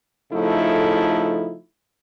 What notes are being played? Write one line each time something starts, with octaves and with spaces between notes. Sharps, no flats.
C#3 F3 A3 D#4 E4 A4